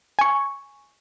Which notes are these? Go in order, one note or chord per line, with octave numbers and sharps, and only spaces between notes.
G#5 C#6